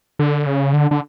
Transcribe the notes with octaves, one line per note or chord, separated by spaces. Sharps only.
D3
C#3
D3
D3